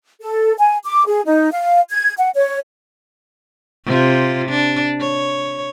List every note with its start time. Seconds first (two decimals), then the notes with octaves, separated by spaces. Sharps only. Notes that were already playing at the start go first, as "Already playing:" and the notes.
0.22 A4
0.58 G#5
0.85 D6
1.07 G#4
1.25 D#4
1.51 F5
1.90 G#6
2.18 F#5
2.35 C#5
3.85 C3 F4
4.49 D4
5.00 C#5